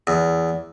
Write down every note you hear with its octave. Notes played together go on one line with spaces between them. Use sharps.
E2